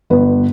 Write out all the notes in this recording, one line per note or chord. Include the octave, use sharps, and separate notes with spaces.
G1 B4